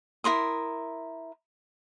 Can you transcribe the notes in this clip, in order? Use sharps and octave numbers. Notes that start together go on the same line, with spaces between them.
E4 A#4 C6 D#6